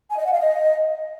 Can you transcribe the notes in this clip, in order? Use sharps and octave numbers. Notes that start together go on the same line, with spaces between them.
G#5
D#5
F#5
F5
D#5